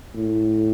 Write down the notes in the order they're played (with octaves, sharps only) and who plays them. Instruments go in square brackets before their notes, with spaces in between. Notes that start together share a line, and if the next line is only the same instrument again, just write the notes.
[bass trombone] A2